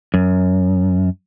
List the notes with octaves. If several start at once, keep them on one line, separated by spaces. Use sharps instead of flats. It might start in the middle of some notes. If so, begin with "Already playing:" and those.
F#2